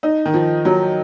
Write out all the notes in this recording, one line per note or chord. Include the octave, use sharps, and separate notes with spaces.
D#4
D#3
F3
F#3